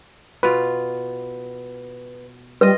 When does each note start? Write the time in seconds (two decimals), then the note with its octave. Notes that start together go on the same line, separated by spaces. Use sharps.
0.43 B2 F4 B4
2.61 G3 F4 B4 D#5